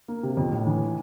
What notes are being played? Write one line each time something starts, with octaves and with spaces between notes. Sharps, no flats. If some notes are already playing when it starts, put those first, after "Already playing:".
A#3
C3
F2
A2
E3